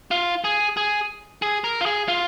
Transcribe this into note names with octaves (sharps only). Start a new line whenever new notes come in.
F4
G#4
G#4
G#4
A#4
F4
G#4
F4